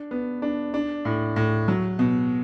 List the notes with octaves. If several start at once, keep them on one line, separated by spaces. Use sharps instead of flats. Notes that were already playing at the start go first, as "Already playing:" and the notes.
Already playing: D4
B3
D4
D4
A2
A2
F#3
B2